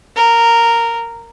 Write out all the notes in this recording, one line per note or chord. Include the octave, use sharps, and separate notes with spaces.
A#4